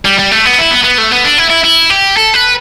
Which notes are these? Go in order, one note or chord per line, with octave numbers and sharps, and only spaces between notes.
G3
G3
A3
B3
E4
B3
B3
A3
B3
D4
E4
E4
E4
G4
A4
B4